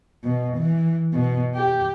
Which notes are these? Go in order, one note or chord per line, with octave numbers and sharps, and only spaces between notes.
B2
E3
B2
G4